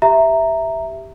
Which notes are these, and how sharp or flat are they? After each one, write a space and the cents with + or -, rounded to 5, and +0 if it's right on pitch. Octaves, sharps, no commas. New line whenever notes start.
G4 +0 E5 +0 A#5 -10